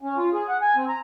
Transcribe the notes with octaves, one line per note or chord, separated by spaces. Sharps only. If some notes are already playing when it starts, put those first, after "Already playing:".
C#4
F4
G#4
F#5
G#5
C4
A#5